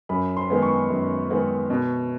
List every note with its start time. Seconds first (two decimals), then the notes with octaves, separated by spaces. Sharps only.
0.09 F#2 B5
0.37 C6
0.50 D#3 G#3 B3
0.62 C#6
0.90 F#2
1.30 D#3 G#3 B3
1.70 B2